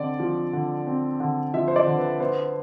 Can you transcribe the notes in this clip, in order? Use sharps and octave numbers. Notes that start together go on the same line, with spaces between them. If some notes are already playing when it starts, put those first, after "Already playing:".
Already playing: D3 C4 D5
F3
D3
C4
D3
F3 E5
C5
D5
D3
B4
B3 C5